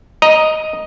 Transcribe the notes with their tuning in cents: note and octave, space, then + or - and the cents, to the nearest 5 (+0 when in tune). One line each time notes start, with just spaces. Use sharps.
D#5 +0 A#5 +15